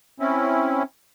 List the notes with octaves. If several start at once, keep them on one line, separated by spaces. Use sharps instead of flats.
C4 C#4 E4